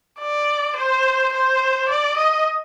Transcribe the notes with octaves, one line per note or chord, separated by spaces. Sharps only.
D5
C5
C5
D5
D#5